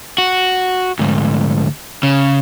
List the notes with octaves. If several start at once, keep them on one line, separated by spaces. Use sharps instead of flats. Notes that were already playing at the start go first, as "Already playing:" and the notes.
F#4
D2 G#2
C#3